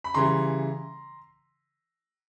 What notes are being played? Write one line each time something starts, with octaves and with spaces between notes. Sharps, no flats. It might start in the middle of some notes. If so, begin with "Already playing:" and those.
B5
C#3 E3 G3 A#5 C6